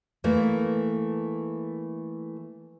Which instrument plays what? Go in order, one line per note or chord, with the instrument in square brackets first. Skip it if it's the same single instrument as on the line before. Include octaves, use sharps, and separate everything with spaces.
[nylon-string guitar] E3 A3 A#3